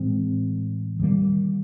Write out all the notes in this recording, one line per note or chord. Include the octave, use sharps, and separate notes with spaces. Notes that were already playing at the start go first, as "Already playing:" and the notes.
Already playing: A2 E3 G#3 C4
D#3 G3 A#3